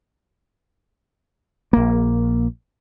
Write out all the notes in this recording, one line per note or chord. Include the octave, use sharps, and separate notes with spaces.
A#1 A#3